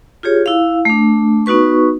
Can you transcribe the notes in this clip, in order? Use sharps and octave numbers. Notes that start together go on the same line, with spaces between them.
F4 G4 G#4 C#5
E4 F5
A3 D4
B3 D#4 F#4 B4 C#6